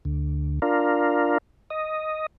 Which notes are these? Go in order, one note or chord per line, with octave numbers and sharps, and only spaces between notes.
D2
D4 F4 A#4
D#5